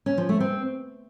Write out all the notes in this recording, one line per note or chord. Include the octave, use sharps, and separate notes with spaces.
C#4
F3
A3
C4